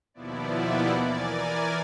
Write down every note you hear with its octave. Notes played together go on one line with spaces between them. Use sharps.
D#2 B2 F3 B3 E4 D5
E3 A#4 D5 G#5